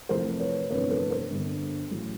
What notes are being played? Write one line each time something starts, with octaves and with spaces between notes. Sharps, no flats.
F2 C3 E3 A3 A#4 C5
B4 C#5
G1 F2 C3 E3 A3 B4 C#5
A4 B4
A#4 C5
G1 G2 D3
A1 A2 F#3 A3